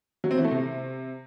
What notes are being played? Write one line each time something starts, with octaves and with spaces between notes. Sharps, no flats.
F#3
C4
E3
A3
C3